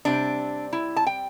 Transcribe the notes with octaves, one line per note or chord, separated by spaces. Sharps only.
C3 G3 C4 D4
E4
A5
G5